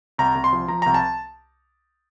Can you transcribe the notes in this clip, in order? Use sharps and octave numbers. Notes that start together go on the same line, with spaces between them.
C2 A#5
C2
C6
F3
F3 A#5
C2 A#5
A5